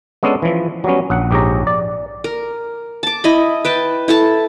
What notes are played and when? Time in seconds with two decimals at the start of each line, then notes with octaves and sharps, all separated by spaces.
0.23 G#3 B3 C#4 D4 A4
0.42 E3 F3
0.84 F#3 G3 B3 C#4
1.10 A#1 F#5
1.31 A#1 G#2 G4 G#4 C#5 A#5
1.67 D5
2.24 A#4
3.03 A5 D6
3.24 E4 D#5 B5
3.65 B4 G5 A5
4.08 E4 A4 A5